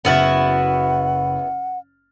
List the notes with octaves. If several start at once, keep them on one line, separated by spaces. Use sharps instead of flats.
F#1 B3 E4 F#4 F#5 F6 A6